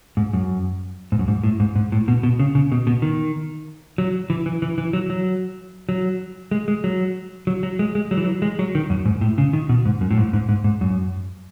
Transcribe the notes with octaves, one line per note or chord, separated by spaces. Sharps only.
G#2
F#2
G#2
F#2
G#2
A2
G#2
G#2
A2
B2
B2
C#3
C#3
B2
B2
D#3
F#3
E3
E3
E3
E3
F#3
F#3
F#3
G#3
G#3
F#3
F#3
F#3
G#3
G#3
F#3
E3
F#3
G#3
F#3
D#3
F#2
G#2
A2
C#3
D#3
B2
G#2
F#2
A2
G#2
G#2
G#2
G#2
F#2